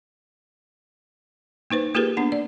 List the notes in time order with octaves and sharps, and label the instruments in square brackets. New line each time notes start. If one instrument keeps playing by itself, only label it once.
[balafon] A#3 D#4 B4 C5
A#3 F4 G4 G#4 A#4 B4
B3 D4 F#5
D5